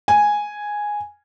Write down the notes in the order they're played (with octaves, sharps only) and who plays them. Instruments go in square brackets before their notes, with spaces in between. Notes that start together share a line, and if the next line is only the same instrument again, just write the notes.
[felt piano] G#5